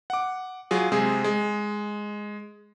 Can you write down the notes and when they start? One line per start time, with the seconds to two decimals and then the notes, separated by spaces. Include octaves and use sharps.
0.10 F#5 D6
0.71 F#3 F4 G#4
0.92 C3 G#3 C4 G#4
1.24 G#3